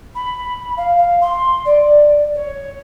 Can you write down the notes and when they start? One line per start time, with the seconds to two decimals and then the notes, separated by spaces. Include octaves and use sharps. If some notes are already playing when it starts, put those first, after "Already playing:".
0.15 B5
0.77 F5
0.97 F5
1.21 C6
1.65 D5
2.34 C#5